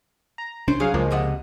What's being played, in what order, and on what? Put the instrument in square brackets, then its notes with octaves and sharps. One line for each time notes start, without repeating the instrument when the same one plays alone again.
[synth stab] A#5
[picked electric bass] C2 C#4 D4 [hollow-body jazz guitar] C5
[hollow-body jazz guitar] F#3 [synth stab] G#4 F5
[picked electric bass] C#2 [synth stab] F3 G#3 A#3
[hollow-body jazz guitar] C3 D#5 F#5